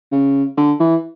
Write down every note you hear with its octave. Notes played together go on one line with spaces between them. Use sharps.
C#3
D3
E3